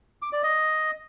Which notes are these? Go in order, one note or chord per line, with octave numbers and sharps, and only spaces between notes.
D6
D5
D#5